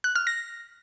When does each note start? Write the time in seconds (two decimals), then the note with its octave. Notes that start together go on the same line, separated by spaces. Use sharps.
0.04 F#6
0.16 F6
0.27 A#6